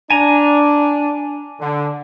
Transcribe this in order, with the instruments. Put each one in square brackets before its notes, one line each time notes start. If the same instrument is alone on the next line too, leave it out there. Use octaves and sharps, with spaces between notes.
[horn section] D4 [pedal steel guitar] G#5 A#5
[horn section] D3